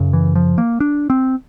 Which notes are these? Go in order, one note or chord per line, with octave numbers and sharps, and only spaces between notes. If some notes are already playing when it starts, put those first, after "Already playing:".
Already playing: F#2 C#3
E3
F3
A#3
D4
C4